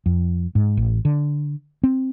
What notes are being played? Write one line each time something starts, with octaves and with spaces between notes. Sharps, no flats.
F2
G#2
A1
D3
C4